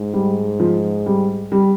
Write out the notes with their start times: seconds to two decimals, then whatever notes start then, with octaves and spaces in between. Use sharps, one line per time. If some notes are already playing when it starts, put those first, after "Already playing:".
Already playing: G#2
0.14 G3
0.60 F3
1.06 G3
1.52 G3